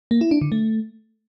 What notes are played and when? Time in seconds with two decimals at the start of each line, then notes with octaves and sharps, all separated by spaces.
0.11 A#3
0.21 E4
0.31 D4
0.41 D3
0.52 A3